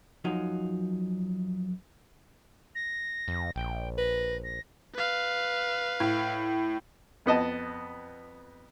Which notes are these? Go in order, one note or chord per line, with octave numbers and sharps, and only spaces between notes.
F#2 F3 F#3 D#4
A#6
F2
A#1 G5
B4 A#6
A#6
B4 F5
A2
F2 B3 D#5 A5